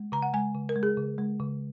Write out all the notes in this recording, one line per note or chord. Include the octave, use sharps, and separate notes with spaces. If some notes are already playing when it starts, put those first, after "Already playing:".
Already playing: G#3
C#3 A#5
F#5
G#3 G#5
C#3
A#4
G#3
G#4
C#3
G#3
C#3